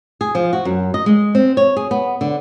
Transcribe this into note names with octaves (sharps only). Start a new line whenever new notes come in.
G#4
F3
F#4
F#2
D#5
G#3
C4
C#5
G#4
B3
D3